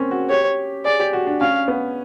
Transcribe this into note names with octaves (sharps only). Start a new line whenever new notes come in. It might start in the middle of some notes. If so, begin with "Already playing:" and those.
Already playing: A#3 C4 C#4
F#4
G4 C#5
G#4 D5
G4
F#4
D4
C#4 F5
B3